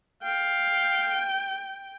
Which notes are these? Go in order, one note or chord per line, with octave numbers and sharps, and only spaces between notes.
F5 G5